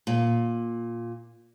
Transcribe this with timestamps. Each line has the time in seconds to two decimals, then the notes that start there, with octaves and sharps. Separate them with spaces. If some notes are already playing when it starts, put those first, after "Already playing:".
0.07 A#2